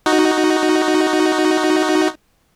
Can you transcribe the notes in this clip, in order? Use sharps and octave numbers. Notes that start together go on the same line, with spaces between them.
D#4 F#4